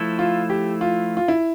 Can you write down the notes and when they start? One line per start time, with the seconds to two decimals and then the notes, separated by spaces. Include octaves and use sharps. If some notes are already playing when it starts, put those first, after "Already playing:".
Already playing: F3 A3 E4 A4
0.19 F4
0.50 G4
0.81 F4
1.17 F4
1.28 E4